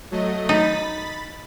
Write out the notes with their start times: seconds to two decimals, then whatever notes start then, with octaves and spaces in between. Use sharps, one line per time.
0.11 F#3 A3 D#5
0.49 D#4 B5 A6 B6